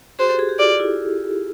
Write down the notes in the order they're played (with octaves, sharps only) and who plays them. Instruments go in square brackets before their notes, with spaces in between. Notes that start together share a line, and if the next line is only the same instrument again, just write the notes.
[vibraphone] F#4 G#4 [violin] C5
[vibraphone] G4 A4
F#4 G#4
G4 A4
[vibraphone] F4 [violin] D5
[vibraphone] E4